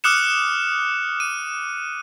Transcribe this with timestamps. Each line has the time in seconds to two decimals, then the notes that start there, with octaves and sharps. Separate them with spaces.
0.04 D6 D#6 F6 F#6 C#7 E7
1.20 D#7